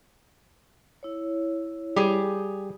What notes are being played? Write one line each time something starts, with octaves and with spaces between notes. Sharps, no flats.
E4 C#5
G3 G4 G#4